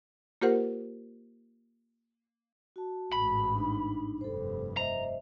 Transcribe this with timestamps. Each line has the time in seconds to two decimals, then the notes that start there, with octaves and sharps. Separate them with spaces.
0.41 A#3 F4 G4 A#4 C5 F#5
2.76 F#4 A5
3.12 A1 G#2 B5
3.55 D4 D#4
4.21 F1 G2 A4 C5
4.77 C5 D#5 E5 A#5